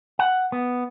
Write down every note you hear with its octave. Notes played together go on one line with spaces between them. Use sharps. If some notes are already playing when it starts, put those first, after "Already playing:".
F#5
B3